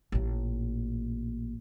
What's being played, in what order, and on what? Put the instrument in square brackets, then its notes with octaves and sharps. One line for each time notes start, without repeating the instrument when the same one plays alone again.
[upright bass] A1 A#2